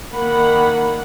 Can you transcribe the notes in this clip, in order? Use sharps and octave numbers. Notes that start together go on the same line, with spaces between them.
D#3 A#3 F#5 B5